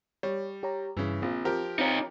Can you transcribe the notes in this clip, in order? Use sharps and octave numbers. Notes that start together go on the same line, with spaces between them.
G3 C#5
G4 C#5 A#5
G2 C#3 E3
A#1 C4 F4
F3 G4 A#4
C4 D#4 C#5 F5